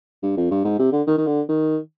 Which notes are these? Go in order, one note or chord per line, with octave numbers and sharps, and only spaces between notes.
G2
F2
G2
G#2
C3
D3
D#3
D#3
D3
D#3